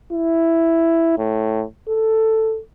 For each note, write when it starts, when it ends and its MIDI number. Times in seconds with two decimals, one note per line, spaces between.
0.13 1.14 64
1.18 1.64 45
1.88 2.60 69